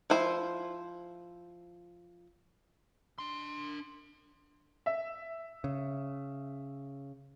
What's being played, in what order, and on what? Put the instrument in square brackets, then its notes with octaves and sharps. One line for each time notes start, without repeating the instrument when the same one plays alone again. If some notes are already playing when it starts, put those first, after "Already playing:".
[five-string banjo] F3 E4 C5
[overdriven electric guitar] D4 C6
[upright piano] E5
[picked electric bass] C#3